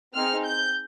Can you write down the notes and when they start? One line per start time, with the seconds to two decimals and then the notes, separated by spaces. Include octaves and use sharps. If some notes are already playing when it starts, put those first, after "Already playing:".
0.14 C4 D#4 G#4 F6
0.45 G6